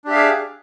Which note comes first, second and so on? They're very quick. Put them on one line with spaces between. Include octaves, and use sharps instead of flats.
D4 G4 E5 F5 G#4